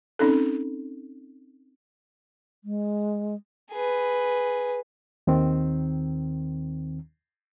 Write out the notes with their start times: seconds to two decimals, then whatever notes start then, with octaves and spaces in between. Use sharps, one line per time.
0.19 C4 C#4 D#4 A4
2.64 G#3
3.72 G#4 B4
5.27 D#2 D#3 C4